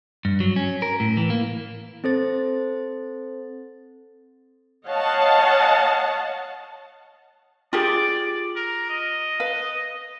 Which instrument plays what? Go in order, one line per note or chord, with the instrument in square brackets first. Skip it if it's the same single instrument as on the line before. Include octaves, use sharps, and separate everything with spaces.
[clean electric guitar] G2
F#3
C#4
A#4
A2
E3
A#3
[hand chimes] C4 A4 C5 A6
[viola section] C#5 D#5 F5 F#5 A5
[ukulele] F4 G4 G#4 [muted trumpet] D5
[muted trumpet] A#4
D#5
[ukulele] B4 F5